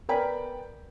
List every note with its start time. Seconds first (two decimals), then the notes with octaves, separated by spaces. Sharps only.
0.09 B3 A#4 D5 G5 G#5 B5